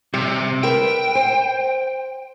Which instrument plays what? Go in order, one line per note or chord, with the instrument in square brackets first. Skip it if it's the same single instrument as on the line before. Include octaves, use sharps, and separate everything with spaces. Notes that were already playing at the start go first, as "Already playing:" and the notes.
[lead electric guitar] C3 [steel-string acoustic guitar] G3
[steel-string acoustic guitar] A#4 B4 E5 [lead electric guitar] G5
[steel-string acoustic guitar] C5